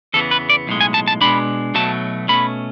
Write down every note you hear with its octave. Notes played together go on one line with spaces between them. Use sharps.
E2 C#3 E3 B3 A4
B4
D5
B1 A2 G#3
G#5
A5
A5
B2 G#3 D4 B5
B1 B2 F#3 A3 A5
B2 A3 C#4 B5